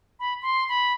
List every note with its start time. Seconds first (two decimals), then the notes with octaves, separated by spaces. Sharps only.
0.20 B5
0.42 C6
0.69 B5